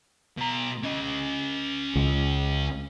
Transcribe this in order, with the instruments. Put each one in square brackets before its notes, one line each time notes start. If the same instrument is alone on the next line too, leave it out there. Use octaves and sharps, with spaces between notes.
[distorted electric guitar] B2 A#5
C#4 D#5
[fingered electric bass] C#2